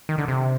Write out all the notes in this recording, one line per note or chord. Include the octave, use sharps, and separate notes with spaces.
D#3
D3
C3